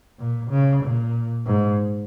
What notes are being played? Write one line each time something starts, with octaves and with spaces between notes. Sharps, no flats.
A#2
C#3
A#2
G#2